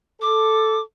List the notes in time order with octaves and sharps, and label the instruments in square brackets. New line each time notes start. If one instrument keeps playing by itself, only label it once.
[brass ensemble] A4 [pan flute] D6